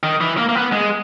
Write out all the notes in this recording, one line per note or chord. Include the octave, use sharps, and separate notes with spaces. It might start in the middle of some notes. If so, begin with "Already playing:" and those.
D#3
E3
A#3
A#3
B3
G#3